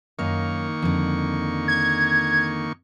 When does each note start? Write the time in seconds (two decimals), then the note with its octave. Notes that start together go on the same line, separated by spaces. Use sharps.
0.19 F#2 D#3 A#3 D#4 F5 C#6
0.82 F2 D3
1.68 G#6